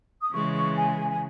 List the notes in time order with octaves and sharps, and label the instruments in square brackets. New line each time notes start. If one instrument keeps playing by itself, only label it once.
[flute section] D#6
[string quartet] C#3 E3 G#3 [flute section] C#6
[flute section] C#6
G#5
G#5